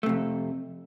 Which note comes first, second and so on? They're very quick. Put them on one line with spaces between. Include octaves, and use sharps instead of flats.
A3 C3 F2